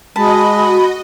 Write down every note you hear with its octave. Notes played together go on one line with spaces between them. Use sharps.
G#3 F#4 D#5 A5 B5